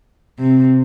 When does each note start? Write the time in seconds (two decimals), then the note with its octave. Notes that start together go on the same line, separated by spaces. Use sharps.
0.41 C3